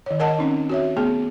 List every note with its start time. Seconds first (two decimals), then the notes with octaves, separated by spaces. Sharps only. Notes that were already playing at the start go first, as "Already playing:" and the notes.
0.06 D#3 C#5
0.20 A#4 D#5 F#5 A5
0.38 C4 C#4 D#4
0.69 F#4 C#5 E5
0.97 A3 B3 G#4